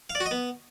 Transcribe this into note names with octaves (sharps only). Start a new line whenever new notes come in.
F5
D5
F#4
D#5
B3